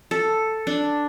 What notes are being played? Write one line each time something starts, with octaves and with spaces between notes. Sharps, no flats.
A4
D4